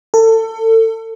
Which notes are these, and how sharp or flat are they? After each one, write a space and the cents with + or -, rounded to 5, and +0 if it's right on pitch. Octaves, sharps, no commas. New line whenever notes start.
A4 +30